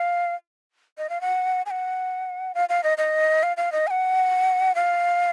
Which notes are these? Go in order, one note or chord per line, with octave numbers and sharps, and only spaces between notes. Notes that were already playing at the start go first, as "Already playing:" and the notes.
Already playing: F5
D#5
F5
F#5
G#5
F#5
F5
F5
D#5
D#5
F5
F5
D#5
G#5
F#5
F5